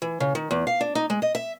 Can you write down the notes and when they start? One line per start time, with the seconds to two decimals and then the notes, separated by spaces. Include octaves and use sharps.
0.02 E3
0.20 C#3
0.35 D#3
0.51 E2
0.67 F5
0.81 D4
0.95 D#4
1.10 G#3
1.22 D#5
1.35 E5